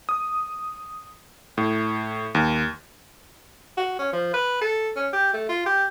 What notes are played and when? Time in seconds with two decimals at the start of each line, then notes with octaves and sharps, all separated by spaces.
0.09 D#6
1.58 A2
2.35 D#2
3.77 F#4
3.99 C#4
4.13 F3
4.34 B4
4.62 A4
4.97 C#4
5.13 G4
5.34 A3
5.49 F4
5.66 G4